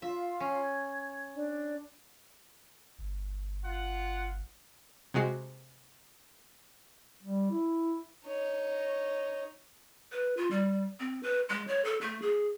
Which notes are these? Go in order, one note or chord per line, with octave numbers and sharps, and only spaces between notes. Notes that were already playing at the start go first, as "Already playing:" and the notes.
F4 E5 F5
C#4
G#6
D4
G1
F4 F#5
C3 G#3 F#4 C7
G3
E4
D#4 C#5
B4
F4
G3
C4
B4
G#3
C#5
A4
A3
G#4